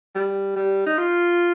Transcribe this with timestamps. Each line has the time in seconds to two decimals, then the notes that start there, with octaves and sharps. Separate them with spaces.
0.15 G3
0.56 G3
0.86 D#4
0.98 F4